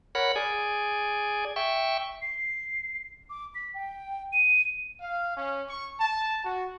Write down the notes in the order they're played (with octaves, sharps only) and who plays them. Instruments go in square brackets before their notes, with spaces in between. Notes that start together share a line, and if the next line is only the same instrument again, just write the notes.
[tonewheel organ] A#4 C#5 F#5 B5
G#4 D5 G#5
E5 G5 C#6
[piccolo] C7
D6
B6
G5
D#7
[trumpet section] F5
C#4
C#6
A5
F#4